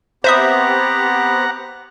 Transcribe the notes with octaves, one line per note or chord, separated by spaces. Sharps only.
B3 C4 G4 C5 E5 F#5 A#5 D#6